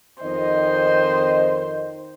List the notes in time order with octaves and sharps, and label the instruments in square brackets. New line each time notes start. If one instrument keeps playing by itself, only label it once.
[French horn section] F2 C4 D#5 [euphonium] D#3 [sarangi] C5